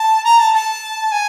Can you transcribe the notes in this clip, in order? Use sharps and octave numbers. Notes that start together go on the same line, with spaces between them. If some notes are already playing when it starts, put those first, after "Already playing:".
Already playing: A5
A#5
A5
A5
G#5